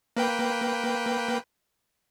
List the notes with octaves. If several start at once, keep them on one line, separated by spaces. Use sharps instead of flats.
A#3 B4 G5